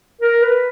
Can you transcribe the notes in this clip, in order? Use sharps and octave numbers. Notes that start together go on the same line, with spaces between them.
A#4
B4